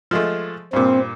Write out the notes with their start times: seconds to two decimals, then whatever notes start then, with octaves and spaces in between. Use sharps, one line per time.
0.11 F3 G#3 A3
0.73 G2 A#2 C4